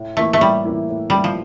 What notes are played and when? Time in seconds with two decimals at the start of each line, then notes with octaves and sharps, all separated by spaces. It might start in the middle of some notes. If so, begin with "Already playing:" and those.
Already playing: A2
0.17 E3 A3 A#3 E4
0.33 A3
0.41 A2 G3
0.65 E3 A#3 E4
0.90 A2
1.10 E3 G3 A#3 E4
1.24 F3